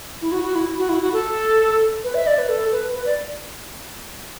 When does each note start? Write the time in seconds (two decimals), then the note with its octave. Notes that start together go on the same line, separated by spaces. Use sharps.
0.22 E4
0.32 F#4
0.44 F#4
0.55 E4
0.78 F#4
0.89 E4
1.01 F#4
1.13 A4
2.04 B4
2.15 E5
2.27 D5
2.38 B4
2.49 A4
2.72 B4
2.94 B4
3.06 D5